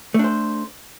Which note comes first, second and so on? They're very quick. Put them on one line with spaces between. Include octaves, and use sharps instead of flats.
A3 D4 C5